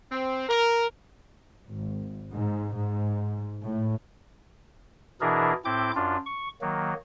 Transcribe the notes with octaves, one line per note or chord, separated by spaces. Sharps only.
C4
A#4
G#1
G#2
G#2
A2
B2 E3 D4 E4 G#4 A#4
A2 C4 E4 D6 G6
F#2 D4 F4
C#6
D#3 F#3 A#3